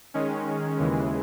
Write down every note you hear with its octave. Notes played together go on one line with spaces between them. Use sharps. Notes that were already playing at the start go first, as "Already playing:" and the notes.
D#3 G#3 C#4
D#2 C#3 E3 G#3